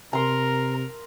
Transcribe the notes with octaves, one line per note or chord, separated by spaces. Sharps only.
C3 A#4 A#5 C6